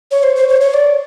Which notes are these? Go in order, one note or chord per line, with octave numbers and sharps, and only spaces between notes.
C#5
C5
C5
C#5
C#5
D5